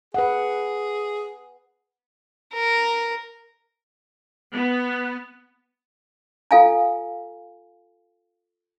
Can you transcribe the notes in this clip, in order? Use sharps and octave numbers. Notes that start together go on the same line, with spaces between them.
G#4 B4 F#5
A#4
B3
F4 A4 F5 G#5 A#5